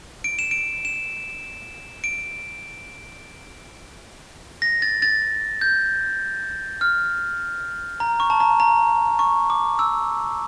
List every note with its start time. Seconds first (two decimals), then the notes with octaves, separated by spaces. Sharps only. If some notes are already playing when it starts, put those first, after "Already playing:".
0.24 D7
0.39 E7
0.51 D7
0.85 E7
2.04 D7
4.62 A#6
4.82 A6
5.02 A6
5.61 G6
6.81 F6
8.00 A#5
8.20 C#6
8.30 A5
8.40 A#5
8.60 A#5
9.19 C#6
9.50 D6
9.79 E6